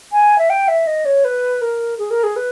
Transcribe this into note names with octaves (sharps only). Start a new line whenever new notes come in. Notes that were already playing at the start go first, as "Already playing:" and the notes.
G#5
E5
G5
E5
D#5
C#5
B4
A#4
G#4
A#4
G#4
B4